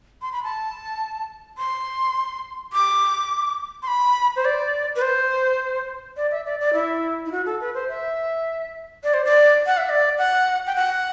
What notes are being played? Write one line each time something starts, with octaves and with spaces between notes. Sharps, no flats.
C6
B5
A5
C6
D6
C6
B5
C5
D5
B4
C5
D5
E5
D5
D5
E4
E4
F#4
A4
B4
C5
E5
D5
C5
D5
F#5
E5
D5
F#5
G5
F#5